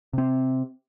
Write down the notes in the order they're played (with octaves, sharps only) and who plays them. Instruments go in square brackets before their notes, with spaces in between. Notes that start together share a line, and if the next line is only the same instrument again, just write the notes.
[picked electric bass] C3 C4